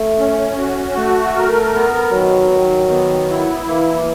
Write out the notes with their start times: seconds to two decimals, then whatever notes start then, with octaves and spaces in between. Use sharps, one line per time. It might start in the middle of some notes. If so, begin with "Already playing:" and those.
Already playing: A3
0.19 C#4
0.58 F#4
0.96 A3
1.36 A#4
1.74 B3
2.13 D#3 F#3
2.51 D#3
2.90 B3
3.29 E4
3.68 E3 A#3